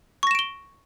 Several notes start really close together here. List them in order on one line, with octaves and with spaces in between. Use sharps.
C#6 A#6 E7 D7 G7